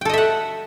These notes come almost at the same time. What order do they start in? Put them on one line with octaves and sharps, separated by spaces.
G5 A4 D#5 E5 F#5